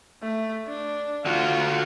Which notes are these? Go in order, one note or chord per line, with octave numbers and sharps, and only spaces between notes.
A3
D4
D3 F4 F#4